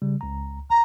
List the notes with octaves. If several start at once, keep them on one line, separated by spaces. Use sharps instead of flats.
C#3 G3
C#2 A#5
G#1 A#5